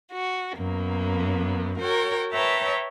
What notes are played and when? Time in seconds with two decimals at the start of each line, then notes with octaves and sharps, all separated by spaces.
0.12 F#4
0.56 F#2 A#3 B3
1.77 F#4 A#4 C#5 G5
2.32 B4 C#5 E5 G5 A5 A#5